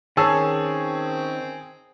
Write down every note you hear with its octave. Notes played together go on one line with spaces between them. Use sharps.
D#3 C4 C#4 G#4 C#5 A5 E6